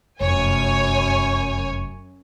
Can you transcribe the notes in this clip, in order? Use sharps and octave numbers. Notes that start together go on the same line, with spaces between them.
F1 F#2 C#5 G#5